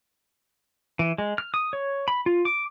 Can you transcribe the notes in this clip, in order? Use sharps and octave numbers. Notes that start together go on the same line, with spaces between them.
E3
G#3
F6
D#6
C#5
B5
F4
D6